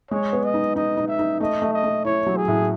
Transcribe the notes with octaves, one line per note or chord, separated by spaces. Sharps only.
G#3 C#5
B3
D#5
D#4
D#4 D#5
D#4
E5
D#4
A3 D#5
A3
D#5
A3
E4 C#5
F#3
G#4
A2